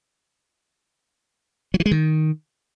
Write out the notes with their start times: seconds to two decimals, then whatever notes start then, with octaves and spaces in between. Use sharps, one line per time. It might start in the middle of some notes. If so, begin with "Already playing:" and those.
1.74 F#3
1.80 E3
1.86 G#3
1.91 D#3